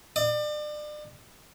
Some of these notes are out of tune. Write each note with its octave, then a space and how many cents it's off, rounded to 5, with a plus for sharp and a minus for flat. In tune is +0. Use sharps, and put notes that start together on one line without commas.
D5 +35